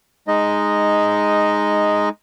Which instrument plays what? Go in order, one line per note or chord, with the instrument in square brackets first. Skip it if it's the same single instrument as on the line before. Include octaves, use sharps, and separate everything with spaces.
[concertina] G#3 D#4 D#5